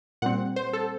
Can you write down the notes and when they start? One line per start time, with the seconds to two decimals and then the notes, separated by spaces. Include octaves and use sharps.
0.22 A#2 G3 C4 F#5
0.56 C5
0.73 A4